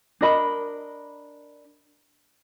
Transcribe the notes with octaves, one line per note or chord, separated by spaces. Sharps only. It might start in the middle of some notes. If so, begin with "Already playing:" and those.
D4 A#4 D#5 B5